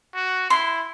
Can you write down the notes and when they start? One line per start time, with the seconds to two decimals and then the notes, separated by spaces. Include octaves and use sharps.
0.15 F#4
0.50 E4 C6